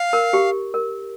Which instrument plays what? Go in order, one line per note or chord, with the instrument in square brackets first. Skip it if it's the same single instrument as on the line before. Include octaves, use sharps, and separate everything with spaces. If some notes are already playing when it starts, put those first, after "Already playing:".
Already playing: [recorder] F5
[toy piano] A#4
G4
A#4